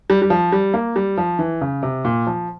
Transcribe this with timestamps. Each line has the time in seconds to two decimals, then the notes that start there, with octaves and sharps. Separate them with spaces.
0.10 G3
0.22 G3
0.30 F3
0.52 G3
0.74 A#3
0.96 G3
1.18 F3
1.39 E3
1.61 C#3
1.83 C3
2.05 A#2
2.27 F3